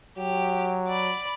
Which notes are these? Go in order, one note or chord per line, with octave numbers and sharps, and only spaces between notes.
F#3 G4
D5 B5